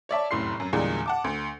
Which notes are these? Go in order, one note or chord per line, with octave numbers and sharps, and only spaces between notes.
C#5 D5 E5 A5
F1 F#2 A2 C6 C7
F#2
E2 A#2 D3 G3 G#3
F#5 A5 D6
D2